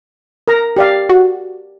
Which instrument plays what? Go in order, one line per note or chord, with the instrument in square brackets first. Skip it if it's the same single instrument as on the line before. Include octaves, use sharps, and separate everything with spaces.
[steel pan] A#4 A#5
G4 D5 F5
[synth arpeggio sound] F#4